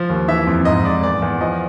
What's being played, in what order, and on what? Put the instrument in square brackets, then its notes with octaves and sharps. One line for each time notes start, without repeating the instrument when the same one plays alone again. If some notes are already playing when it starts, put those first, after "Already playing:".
Already playing: [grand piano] F3
D#2
E3 E5
F2
G#2 D#5
G#2 D5
E2 D5
E2
F3 D#5